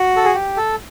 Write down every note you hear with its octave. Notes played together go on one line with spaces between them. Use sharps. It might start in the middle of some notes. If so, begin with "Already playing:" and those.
Already playing: F#4
A4
G#4
G4
A4